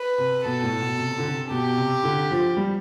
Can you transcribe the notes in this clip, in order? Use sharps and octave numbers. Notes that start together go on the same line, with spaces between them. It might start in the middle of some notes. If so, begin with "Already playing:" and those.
Already playing: B4
C3
B2 A4
A2
B2
C3
D3
C3
B2 G4
C3
D3
F3
G3